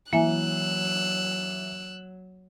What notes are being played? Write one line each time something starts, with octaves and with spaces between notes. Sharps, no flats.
E3 F#3 A#3 E5 G#5 E6 F#6